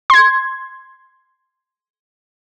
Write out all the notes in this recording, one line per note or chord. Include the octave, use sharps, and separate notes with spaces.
C6 G#6